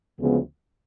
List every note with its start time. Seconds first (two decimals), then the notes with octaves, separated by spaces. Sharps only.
0.19 D2 C#3 F3 G#3 B3